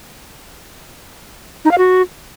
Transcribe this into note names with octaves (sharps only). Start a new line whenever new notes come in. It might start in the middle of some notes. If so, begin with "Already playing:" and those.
D#4
F5
F#4